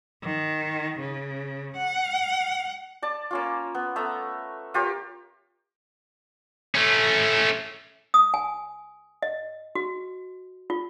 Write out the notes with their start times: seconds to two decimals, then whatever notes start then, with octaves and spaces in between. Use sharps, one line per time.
0.22 D#3
1.00 C#3
1.77 F#5
3.02 D5 A5
3.31 A#3 C#4 F4
3.75 B3
3.96 A3 B3 E5 A#5
4.74 F4 G4 A#4 C#5
6.75 A3 C#4
8.14 D#6
8.34 G#5
9.22 D#5
9.75 F#4
10.70 F4